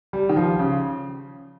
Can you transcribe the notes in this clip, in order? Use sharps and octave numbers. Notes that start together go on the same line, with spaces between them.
G3
D#3
F3
C#3